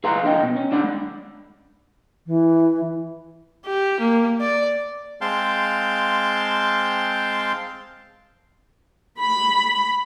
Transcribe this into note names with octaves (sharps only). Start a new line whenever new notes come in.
G#4 B4 F5 A#5 C6
F2 D4 D#5 G5
B2
C#4
D4 D5 F#5 B5
G#3
E3
G4
A#3
D5
G#3 C4 F5 G5 A5 C6
B5